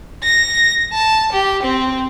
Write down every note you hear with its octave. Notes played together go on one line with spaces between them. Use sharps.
A#6
A5
G4
C4